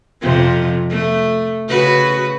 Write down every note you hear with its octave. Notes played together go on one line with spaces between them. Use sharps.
F2 C3 F3
A3
C#3 F#4 B4